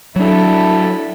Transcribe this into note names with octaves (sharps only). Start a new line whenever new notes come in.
F#3 D4 E4 A4